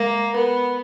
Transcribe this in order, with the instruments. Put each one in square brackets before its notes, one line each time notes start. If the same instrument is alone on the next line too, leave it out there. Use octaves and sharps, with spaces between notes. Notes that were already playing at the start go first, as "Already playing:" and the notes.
Already playing: [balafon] G#3 [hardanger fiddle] A#3
[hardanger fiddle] B3 [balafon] A#4